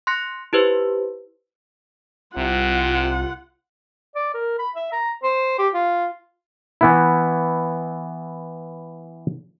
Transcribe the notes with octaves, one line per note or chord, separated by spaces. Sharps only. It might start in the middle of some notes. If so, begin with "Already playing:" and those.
C6 F#6 A#6 C#7
E4 G4 B4 C5
C2 C3 F4 F#5
D5
A#4
B5
E5
A#5
C5
G4
F4
E3 B3 E4